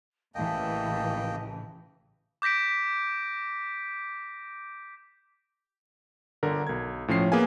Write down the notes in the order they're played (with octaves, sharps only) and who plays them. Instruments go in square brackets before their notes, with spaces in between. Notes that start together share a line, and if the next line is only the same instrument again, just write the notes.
[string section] A1 C#3 E3 [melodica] A#3 D#5 G5 [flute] A5
[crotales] D6 G6 A#6 B6 D7
[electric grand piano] G1 D3 A#4 A#5
B1 G#6
A2 F3 C#4 C7
A#3 B3 G#4 B4 F5 G#5